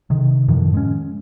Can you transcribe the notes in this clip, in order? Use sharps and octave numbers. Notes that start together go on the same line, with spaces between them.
C3 D#3
F#2 A2 D#3 F3
G#3 C#4